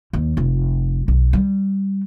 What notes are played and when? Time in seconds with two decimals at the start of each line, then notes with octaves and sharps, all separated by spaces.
0.13 D#2
0.37 F1
1.08 B1
1.33 G3